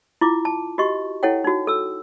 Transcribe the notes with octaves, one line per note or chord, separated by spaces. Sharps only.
E4 F4 D6
A5
F#4 G4 D#5 C#6
E4 A4 C#5 F#5 G5
D#4 F#4
A4 E6